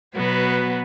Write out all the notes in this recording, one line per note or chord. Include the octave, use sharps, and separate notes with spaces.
B2 F#3 B3 F#4 B4